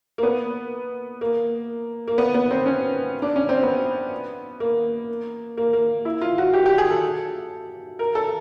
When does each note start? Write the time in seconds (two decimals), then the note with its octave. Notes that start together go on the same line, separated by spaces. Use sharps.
0.18 A#3
0.23 B3
1.21 A#3
2.08 A#3
2.18 B3
2.34 B3
2.51 C4
2.66 C#4
3.22 D4
3.36 C#4
3.49 C4
3.63 B3
4.60 A#3
5.57 A#3
5.73 A#3
6.05 E4
6.21 F4
6.38 F#4
6.54 G4
6.66 G4
6.78 G#4
6.90 A4
7.99 A#4
8.15 A4